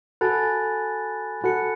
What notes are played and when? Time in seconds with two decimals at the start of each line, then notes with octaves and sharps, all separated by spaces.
0.21 F#4 A4 G#5 B5 F#6 A6
1.44 F#4 A4 B5 F#6 C#7